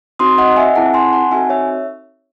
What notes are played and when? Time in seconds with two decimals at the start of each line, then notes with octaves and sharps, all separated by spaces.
0.19 C4 D#4 F#4 C6 D#6
0.38 D#5 F#5
0.56 E5 G#5
0.75 C4 E4 G#4 F#5 A5
0.94 G#5 C6
1.13 F#5 A5
1.31 C4 D#4 F#4 A4 E5 G#5
1.50 C#5 E5